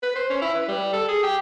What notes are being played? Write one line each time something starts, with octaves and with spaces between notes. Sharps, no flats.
B4
C5
C#4
E4
B4
G3
A4
G#4
G4